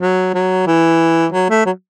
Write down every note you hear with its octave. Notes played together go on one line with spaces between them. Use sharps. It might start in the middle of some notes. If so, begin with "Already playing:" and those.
F#3
F#3
E3
F#3
A3
F#3